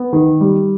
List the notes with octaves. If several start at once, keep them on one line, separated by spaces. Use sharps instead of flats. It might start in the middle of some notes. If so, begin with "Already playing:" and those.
Already playing: B3
D#3
G3